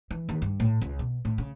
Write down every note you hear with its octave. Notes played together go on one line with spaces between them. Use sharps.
E3
D#2
G2
A2
C#2
B2
A2
C#3